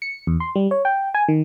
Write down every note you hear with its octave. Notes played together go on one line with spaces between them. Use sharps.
C#7
E2
C6
G3
C#5
G5
G#5
D#3